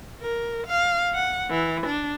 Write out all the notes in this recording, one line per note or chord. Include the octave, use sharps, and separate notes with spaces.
A#4
F5
F#5
E3
D4